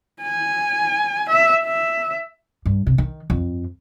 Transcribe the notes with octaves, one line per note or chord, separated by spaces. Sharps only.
G#5
E5
E5
G2
C3
D#3
F2